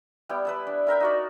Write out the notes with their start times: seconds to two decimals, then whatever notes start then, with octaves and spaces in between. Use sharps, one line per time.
0.29 G3 B3 E4 G5
0.45 B4 E5 A5
0.67 D4
0.87 E4 A#4 E5 G5
1.00 D#4 F#4 D5